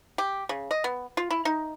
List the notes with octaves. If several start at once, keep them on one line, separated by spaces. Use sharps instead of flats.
G4
C#3
D#5
B3
F4
E4
D#4